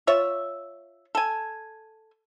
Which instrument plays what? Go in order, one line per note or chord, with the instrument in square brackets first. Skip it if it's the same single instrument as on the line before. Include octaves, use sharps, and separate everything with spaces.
[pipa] F4 C#5 E5
A4 G#5